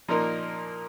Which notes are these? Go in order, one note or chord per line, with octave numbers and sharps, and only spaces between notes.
A#2 F3 A#3 D#4 A#4